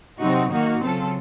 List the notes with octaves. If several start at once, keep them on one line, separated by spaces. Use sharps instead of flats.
C3 F#3 C4 D#4 F#4
D#3 A#3 D#4 F#4
C#3 F#3 C4 F4 A4